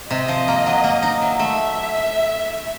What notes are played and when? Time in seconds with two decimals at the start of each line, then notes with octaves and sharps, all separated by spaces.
0.11 C3 D#5
0.28 F3
0.48 A#3
0.66 F#3
0.84 A#3
1.03 D#4
1.21 F#3 E5
1.39 A3